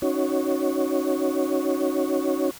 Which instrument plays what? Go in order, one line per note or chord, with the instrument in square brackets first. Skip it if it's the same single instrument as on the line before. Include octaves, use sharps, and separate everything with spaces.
[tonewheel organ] C#4 D#4 F#4 C#5